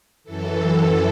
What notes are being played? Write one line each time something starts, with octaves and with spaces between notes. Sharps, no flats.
F#2 E3 A4